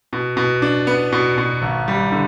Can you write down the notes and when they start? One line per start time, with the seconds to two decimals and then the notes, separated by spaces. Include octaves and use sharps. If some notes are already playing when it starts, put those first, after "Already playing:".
0.13 B2
0.37 B2
0.62 D4
0.87 B3
1.12 B2
1.38 B2
1.62 G#1
1.88 G3
2.12 D3